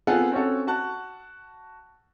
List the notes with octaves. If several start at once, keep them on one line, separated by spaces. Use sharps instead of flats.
B3 C4 F4 G#4 A4 F#5
C4 C#4 F#4 A4
F#4 A5 F#6